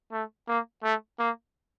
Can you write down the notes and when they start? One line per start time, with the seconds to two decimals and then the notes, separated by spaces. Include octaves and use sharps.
0.12 A3
0.48 A#3
0.83 A3
1.19 A#3